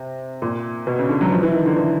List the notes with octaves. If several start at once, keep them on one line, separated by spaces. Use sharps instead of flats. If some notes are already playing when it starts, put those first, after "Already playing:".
Already playing: C3
A#2
B2
C#3
D3
F#3
F3
E3
D#3
D3
E3